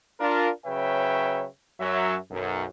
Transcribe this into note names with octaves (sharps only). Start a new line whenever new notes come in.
D4 F4 A#4
C#3 F#3 B4 C#5 E5 G5
F#2 F#3 E5
B1 F#2